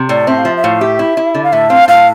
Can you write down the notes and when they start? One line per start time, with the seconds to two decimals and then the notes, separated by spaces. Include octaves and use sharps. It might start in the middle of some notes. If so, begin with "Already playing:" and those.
Already playing: C3
0.09 A2 D5
0.27 C4 E5
0.38 F5
0.45 F3 E5
0.57 E5
0.64 A2 F5
0.81 G4 E5
0.99 E4
1.17 E4
1.35 D3
1.44 F5
1.52 A2 E5
1.70 C4 F5
1.88 A2 F5